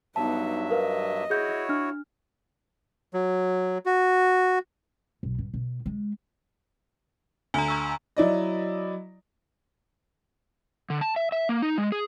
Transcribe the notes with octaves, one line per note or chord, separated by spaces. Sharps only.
G2 F#3 B3 D#4 E5 A5
A#4 B4 D#5 F5
E4 F#4 G#4 C#5 G6
D4 F6
F#3
F#4
B1
G2
B2
G#3
D2 G#5 A#5
A#5 C#6 E6
F#3 E4 D5 D#5
D3
A5
E5
E5
A#3
D#4
G#3
G#4